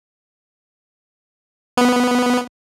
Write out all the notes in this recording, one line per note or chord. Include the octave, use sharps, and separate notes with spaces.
B3